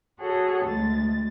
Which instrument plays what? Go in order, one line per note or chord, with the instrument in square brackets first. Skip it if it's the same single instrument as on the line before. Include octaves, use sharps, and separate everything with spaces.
[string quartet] F#4 G#4 A4 C#5 F#5
D2 G#3 A6